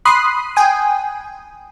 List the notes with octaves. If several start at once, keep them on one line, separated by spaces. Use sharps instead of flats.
B5 C6 D#6 F#6 C7
G5 G#5 D#6